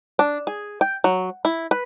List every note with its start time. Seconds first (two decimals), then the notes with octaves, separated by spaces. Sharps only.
0.19 D4
0.47 G#4
0.81 G5
1.04 F#3
1.45 E4
1.71 B4